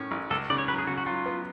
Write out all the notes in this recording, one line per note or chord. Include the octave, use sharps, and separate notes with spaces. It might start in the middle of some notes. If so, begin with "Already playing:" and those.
Already playing: A2 C#4
A1
C#2 A4
C#3 D5
C#5
F#3 B4
G#4
C#3 F#4
F#4
F#3 F4
B3